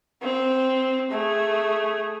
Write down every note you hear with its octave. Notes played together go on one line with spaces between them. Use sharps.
C4
A3 G#4